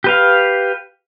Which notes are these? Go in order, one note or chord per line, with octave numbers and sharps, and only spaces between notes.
G4 B4 F5